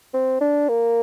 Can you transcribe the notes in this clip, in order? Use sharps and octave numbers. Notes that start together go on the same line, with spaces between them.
C4
D4
A#3